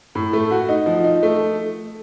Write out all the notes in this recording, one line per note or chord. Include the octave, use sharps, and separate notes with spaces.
A2
A3
F#4
D#4
F3
D#4
A3